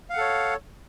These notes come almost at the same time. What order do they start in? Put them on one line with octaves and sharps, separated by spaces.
F5 F#5 A4 C#5